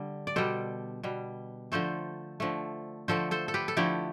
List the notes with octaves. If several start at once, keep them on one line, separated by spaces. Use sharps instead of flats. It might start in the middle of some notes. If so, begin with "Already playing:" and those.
Already playing: D3 G3
D5
B2 G3 A4 C5
B2 G3
D3 F3 A3 A4 C5
D3 F3 A3
D3 F3 A3 A4 C5
A4 C5
A4
G4 B4
A4
D3 F3 A3 E4 G4